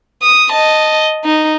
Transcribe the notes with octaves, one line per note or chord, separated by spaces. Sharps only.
D#6
D#5 A5
D#4